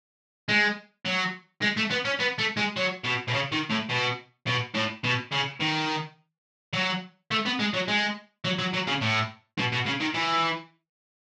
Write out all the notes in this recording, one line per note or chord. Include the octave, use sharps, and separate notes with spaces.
G#3
F#3
G#3
A3
B3
C#4
B3
A3
G#3
F#3
B2
B2
C#3
D#3
A2
B2
B2
A2
B2
C#3
D#3
F#3
A3
B3
G#3
F#3
G#3
F#3
F#3
F#3
C#3
A2
B2
B2
C#3
D#3
E3